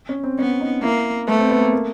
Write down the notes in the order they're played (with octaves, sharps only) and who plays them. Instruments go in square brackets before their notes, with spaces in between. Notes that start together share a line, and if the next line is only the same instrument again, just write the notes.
[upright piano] C#4
C4
[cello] B3 [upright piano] C#4
[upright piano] D#4
[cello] A#3 [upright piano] E4
[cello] A3 [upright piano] B3
[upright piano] C4
B3
A#3
A#3